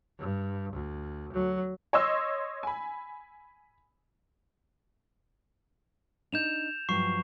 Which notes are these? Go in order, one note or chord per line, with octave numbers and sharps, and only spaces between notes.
G2
D2
F#3
C#5 D#5 C6 E6
G#5 B5
D4 D#4 G6 E7 F7
G2 F3 F#3 C#6 C7